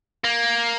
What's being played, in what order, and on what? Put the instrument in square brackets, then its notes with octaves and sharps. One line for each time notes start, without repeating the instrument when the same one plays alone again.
[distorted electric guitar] A#3